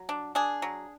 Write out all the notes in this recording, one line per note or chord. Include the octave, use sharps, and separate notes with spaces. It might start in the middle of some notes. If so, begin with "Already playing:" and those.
Already playing: F#3
D4
D4 G#4
F#3